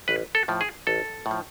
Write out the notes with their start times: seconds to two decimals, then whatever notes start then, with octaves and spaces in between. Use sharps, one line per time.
0.08 A1 B4
0.35 A4
0.48 A2 F3
0.61 G#4
0.87 A1 A4
1.26 A2
1.31 F3